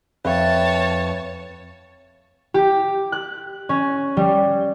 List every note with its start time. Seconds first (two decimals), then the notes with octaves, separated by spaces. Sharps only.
0.25 F2 B4 C#5 E5 F5 G5 A5
2.54 G4
3.12 F#6
3.69 C#4
4.17 G3